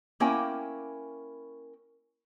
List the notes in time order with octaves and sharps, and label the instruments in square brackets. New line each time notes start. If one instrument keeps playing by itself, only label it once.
[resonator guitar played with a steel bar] A#3 C#4 E4 A#4 G5 G#5